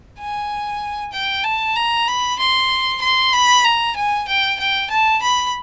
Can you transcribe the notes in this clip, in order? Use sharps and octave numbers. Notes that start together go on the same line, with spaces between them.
G#5
G5
A5
A#5
B5
C6
C6
B5
A#5
G#5
G5
G5
A5
B5